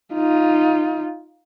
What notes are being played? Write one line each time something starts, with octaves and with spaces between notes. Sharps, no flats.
D#4 F4